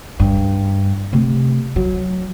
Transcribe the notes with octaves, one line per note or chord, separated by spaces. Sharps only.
G2
C3 A3
F#3